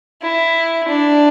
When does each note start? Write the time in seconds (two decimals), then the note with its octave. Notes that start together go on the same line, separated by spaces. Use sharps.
0.22 E4
0.89 D4